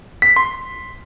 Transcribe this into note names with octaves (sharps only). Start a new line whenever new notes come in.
B6
C6